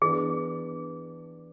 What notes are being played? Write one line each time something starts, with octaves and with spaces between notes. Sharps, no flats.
E3 B3 D4 G#4